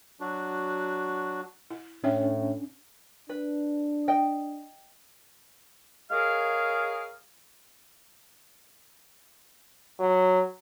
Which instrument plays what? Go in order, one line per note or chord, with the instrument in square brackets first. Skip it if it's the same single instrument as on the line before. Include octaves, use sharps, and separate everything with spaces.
[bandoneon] F#3 D4 F#4
[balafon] E4
[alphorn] A2 [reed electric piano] C#4 D4 [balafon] C#5 E5 G5
[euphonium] D4 [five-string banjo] B4
[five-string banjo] D#5 G5
[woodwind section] G#3 G#4 A#4 C#5 F5
[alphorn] F#3